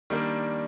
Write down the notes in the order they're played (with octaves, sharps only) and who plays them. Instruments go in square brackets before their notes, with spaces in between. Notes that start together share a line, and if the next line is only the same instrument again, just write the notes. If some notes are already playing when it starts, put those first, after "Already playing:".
[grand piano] D#3 G3 A#3 D4